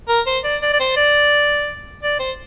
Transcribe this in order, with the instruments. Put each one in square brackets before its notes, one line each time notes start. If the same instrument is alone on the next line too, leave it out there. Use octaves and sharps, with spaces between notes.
[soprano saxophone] A#4
C5
D5
D5
D5
C5
D5
D5
C5